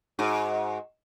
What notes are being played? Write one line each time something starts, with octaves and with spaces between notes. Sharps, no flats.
G#2 F#4